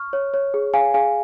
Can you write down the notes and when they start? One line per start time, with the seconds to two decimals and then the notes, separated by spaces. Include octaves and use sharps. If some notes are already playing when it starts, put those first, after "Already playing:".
Already playing: C#6 F6
0.13 C#5
0.34 C#5
0.54 G#4
0.74 G#4 F5 G#5
0.94 G#4 F5 G#5